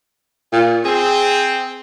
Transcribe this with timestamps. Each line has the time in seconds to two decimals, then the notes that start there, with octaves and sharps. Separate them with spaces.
0.53 A#2
0.85 C4 G#4